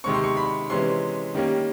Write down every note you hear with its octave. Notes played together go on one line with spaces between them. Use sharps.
C3 D#3 G#3 C4 C#6
C6
C#6
B5
C3 E3 G#3 C#4 C6
D#3 G3 A#3 C#4